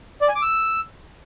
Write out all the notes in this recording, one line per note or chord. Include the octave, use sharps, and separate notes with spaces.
D5
G#5
D6
E6